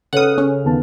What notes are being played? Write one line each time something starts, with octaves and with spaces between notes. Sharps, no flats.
C#3 A4 B4 C#5 F#5 D#6 F6
C#4
D#2 B3 A5